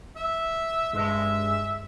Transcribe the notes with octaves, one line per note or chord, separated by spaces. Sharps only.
E5
G2 G#3 E5